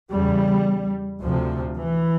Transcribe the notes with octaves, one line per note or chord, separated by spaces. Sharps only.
E2 C#3 G3
D2 C3 F3
E3